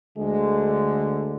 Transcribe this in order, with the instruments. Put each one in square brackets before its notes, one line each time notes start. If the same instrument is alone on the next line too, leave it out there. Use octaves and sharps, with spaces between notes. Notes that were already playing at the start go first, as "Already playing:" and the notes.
[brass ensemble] D2 D3 G#3